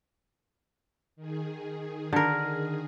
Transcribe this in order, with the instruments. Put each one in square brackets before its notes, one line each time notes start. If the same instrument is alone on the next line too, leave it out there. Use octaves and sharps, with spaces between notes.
[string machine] D#3 G#4
[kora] D3 A#4